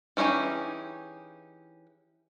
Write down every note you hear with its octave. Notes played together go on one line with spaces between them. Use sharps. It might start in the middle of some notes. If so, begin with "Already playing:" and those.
E3 C#4 D#4 G4 G#4